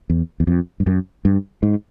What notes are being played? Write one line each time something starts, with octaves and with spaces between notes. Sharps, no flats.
E2
E2
F2
G2
F#2
G2
G#2